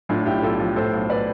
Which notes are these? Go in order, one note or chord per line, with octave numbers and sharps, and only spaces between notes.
A2 D4 F4
B1 E4 G4
B1 F4 A4
F3
A2 A4 C5
B1
B4 D5